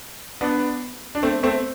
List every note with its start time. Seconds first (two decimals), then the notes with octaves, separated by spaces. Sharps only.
0.41 B3 D4
1.15 D4
1.23 A3 C4
1.43 A3 C4